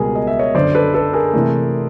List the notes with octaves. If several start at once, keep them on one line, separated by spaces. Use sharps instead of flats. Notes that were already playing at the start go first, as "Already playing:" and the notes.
Already playing: C#2 B2 G3 B3 G#4 A#4
D#5
E5
C#5 D#5
G1 F#2 D3 C5 D5
A4 B4
A4 B4
G#4 A#4
C3 E3 A3